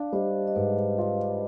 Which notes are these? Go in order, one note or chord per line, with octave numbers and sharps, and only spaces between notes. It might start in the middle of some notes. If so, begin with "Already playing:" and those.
Already playing: D4 D5 F5
G3 C5 D#5
D#5
G#2 B4 D5
F4